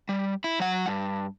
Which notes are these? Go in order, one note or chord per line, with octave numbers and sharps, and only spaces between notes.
G3
E4
F#3 F#5
G2